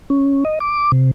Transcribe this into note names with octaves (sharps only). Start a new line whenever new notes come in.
C#4
D#5
D6
C3